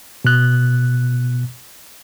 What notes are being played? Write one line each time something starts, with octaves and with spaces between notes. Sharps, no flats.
B2 F#6